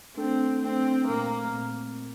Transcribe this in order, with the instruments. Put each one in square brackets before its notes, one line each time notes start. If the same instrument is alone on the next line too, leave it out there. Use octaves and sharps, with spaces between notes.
[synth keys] A3 D4 A4 [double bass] C4
[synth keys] A3 D4 A4 [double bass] C4
[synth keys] A#2 A3 C4 [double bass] A#3
[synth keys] A#2 A3 C4
A#2